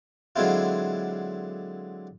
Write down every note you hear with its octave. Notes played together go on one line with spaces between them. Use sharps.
D3 F#3 G#3 C4 E4 F4